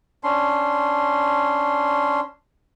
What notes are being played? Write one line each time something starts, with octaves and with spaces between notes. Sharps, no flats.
C#4 D4 C6